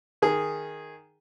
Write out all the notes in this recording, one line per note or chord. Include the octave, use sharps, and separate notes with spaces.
D#3 G#4